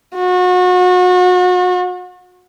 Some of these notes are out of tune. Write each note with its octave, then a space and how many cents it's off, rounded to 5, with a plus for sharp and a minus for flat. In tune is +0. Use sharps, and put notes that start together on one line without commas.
F#4 -35